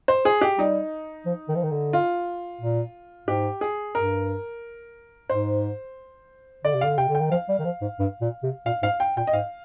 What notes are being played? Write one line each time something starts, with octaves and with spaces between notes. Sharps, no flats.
C5
G#4
G4
G3 D#4
F3
D#3
F3
D#3
D3
F4
A#2
G#2 G4
G#4
G2 A#4
G#2 C5
D3 D5
C3
D3 F5
C3 G5
D3
G5
D#3
F3 F5
G3
D#3
F3
G#2
G2
A#2
C3
A#2 F5
G#2 F5
G5
A#2 G5
D#5
G#2 F5